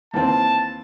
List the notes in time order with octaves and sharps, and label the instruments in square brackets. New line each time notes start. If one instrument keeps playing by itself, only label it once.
[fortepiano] D#2 E3 C4 [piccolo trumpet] A5